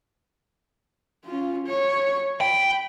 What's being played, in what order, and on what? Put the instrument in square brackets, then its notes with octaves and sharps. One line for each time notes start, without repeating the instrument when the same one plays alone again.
[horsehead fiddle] C#4 F4
C#5
[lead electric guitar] G5 [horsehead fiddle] B5